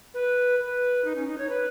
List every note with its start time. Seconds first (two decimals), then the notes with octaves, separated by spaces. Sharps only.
0.14 B4
0.59 B4
1.04 D#4
1.15 C#4
1.27 D#4
1.38 C#5
1.49 B4